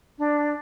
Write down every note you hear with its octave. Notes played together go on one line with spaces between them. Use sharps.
D4